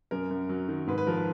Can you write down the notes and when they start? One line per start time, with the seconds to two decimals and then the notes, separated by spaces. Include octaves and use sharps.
0.11 F#2 A#4
0.31 F#2
0.49 F#3
0.69 D#3
0.87 G#2 B4
0.98 B4
1.07 F3 A#4
1.17 B4